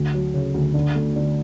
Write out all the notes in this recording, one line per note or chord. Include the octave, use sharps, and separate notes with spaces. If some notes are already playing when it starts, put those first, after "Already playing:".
Already playing: D2
F#3
C#3
D2
D3
A3
D3